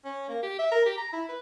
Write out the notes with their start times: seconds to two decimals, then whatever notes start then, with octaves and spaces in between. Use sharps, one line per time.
0.05 C#4
0.29 A#3
0.43 G4
0.59 E5
0.72 A#4
0.86 G4
0.98 A#5
1.13 E4
1.28 B4